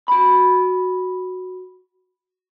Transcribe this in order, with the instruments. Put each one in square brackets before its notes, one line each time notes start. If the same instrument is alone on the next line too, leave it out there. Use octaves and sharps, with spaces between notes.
[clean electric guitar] F#4 B5